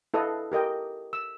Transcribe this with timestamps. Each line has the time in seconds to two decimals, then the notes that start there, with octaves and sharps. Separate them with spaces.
0.14 E4 A4 B4 D#5 F5
0.52 G4 A#4 D#5 G5
1.13 E6